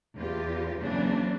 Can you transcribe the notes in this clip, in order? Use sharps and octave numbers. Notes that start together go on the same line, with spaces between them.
E2 F4 G4
F#2 C#3 E3 A#3 C4 D4